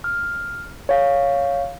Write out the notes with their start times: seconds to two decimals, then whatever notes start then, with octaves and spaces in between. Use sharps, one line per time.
0.04 F6
0.89 C#5 F5